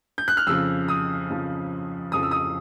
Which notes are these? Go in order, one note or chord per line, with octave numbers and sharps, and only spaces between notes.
G6
F#6
F6
F2 C#3 F3 E6
D#6
F2 C#3 F3
F2 C#3 F3 D#6
E6
D#6